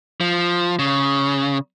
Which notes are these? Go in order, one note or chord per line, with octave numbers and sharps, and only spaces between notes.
F3
C#3